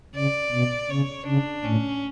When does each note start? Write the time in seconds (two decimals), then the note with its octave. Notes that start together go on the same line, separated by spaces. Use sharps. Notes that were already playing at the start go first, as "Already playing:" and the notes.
0.15 C#3 D5
0.52 B2
0.90 C#3 C#5
1.26 C#3 D4
1.65 A2 C#4